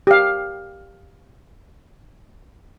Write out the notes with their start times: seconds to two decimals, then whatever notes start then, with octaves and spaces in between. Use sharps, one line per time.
0.07 G4 F5